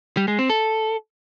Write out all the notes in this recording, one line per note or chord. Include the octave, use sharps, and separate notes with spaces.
G3
G#3
C4
A4